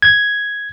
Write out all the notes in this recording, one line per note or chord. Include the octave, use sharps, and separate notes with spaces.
G#6